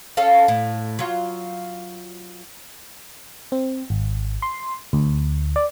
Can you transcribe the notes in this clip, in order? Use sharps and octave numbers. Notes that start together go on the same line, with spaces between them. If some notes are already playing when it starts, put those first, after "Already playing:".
C#4 A4 F5
A2
F#3 F4
C4
G#1
C6
D2
D5